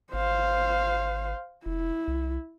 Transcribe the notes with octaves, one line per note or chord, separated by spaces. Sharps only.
G#1 C5 F5
F1 E4
C2